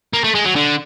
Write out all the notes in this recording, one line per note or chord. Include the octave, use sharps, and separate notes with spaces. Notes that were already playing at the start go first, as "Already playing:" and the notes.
A#3
A3
G#3
F#3
D3